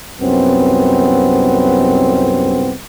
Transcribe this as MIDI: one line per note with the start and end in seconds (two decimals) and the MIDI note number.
0.21 2.73 36
0.21 2.73 42
0.21 2.73 59
0.21 2.73 60